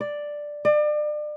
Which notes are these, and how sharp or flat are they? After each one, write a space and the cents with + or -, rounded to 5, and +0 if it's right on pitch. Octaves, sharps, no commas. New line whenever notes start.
D5 +5
D5 +35